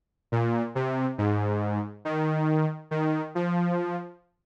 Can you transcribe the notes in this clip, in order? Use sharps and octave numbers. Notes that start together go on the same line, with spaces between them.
A#2
C3
G#2
D#3
D#3
F3